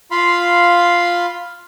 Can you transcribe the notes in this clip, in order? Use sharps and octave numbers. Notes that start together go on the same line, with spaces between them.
F4 F5 B5 C6